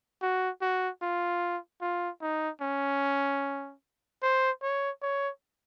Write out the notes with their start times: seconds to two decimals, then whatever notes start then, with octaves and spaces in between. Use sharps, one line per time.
0.22 F#4
0.61 F#4
1.02 F4
1.81 F4
2.22 D#4
2.62 C#4
4.23 C5
4.62 C#5
5.02 C#5